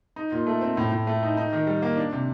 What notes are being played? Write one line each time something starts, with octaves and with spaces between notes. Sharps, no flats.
D#4
A#2
A3
C4
A2
A2
A3
D#4
D#4
D#3
G3
A#3
D4
C3